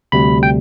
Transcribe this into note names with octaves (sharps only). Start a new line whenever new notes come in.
D2 C3 G3 B5
G5